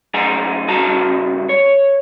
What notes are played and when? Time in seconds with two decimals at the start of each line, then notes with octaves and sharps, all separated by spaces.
0.14 F#2 D#4 G#4 G#5 A#5
0.68 G2 C#3 F#4 A5 A#5
1.49 C#5